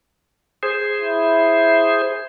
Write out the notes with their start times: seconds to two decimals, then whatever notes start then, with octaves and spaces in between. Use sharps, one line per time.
0.63 G#4 C5
1.01 E4